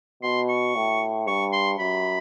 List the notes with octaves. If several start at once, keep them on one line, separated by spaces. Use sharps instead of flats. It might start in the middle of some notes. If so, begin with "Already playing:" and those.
B2 C6
C#6
A2
G2 C#6
C6
F#2 B5